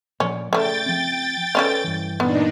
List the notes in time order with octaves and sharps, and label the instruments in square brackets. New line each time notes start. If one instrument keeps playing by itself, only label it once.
[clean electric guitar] A#2 F3 D5 [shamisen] C#4
[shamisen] C#3 A3 [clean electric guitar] G#4 D5 [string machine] G5 A6
[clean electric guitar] F3 C4
[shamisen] F3 C#4 F5 [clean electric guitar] A4 B4 D5
[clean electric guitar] G2 E3
[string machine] A#2 D4 D#4 [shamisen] B3